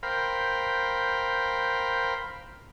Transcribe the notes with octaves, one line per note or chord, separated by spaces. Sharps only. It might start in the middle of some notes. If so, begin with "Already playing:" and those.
A#4 C5 F5 G5 B5